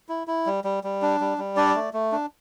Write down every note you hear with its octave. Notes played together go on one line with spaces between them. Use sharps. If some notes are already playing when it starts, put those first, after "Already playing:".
E4
E4
G3
G3
G3
D4
G3
G3
D4 D5
A3
A3
D4